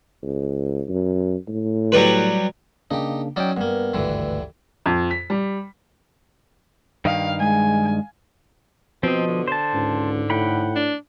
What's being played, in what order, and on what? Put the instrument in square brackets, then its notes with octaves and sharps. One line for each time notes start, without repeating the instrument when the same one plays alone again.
[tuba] C#2
F#2
A2
[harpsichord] F#3 G3 B4
[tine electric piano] C#3 A#3 D4 [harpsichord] D#4 G4
[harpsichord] F#3 C#4 D#4 [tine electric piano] D5 G5
[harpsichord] G2 A#3 [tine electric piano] B3
[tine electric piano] G#1 D2 [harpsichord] G2 D3 E3
[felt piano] F2
B6
G3
[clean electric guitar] G2 D#3 [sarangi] F5
[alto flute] G#3 [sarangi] G#5
[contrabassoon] B2 [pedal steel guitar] F3 D#5 [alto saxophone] C4
[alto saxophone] D3
[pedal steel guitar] C5 A5
[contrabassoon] C#2 [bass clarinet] G#2
[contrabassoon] A2 [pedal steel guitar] F#5 G5 B5
[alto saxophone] D4